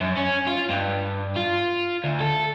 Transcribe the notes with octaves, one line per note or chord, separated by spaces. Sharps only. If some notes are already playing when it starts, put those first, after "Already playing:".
F#2
C#4
F4
G2
F4
D2
A4